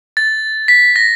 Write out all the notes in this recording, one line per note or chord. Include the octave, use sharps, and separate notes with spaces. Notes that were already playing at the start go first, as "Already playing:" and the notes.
A6
B6
A#6